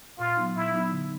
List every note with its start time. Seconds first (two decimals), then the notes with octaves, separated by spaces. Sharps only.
0.19 A#2 F4
0.37 F#3 B3 D#4
0.55 A#2 E4
0.73 F#3 B3 D#4
0.91 D3